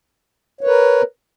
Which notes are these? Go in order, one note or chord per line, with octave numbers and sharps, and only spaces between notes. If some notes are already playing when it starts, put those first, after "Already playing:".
A#4 B4 C#5